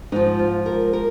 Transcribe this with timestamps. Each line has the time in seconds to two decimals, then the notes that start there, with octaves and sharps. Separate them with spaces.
0.12 G#2 F3 D#4
0.39 F4
0.66 A#4
0.93 A#4